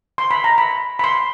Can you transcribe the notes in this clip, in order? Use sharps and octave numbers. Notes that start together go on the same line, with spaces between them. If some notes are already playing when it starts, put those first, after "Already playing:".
C6
B5
A#5
B5
B5
C6